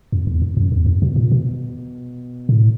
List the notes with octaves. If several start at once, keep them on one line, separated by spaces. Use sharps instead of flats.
F2
E2
F2
F#2
E2
F2
B2
A#2
B2
A2